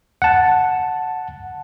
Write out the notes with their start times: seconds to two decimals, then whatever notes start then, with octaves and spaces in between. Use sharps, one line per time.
0.22 F#5 A5